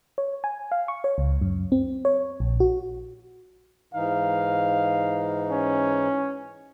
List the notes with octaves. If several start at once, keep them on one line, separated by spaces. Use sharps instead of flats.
C#5
G#5
F5
C#6
C#5
C#2
F#2
C4
C#5
A#1
F#4
G#2 E3 D#4 F5
C#4